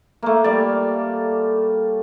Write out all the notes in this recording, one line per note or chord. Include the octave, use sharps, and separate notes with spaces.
A3 A#3
G3 D5